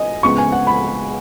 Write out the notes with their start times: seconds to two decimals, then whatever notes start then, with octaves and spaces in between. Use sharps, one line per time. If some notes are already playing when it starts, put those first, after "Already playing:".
Already playing: D#5 G#5
0.23 C#2 C#3 B3 C#6
0.38 G#5
0.52 F#5
0.67 B5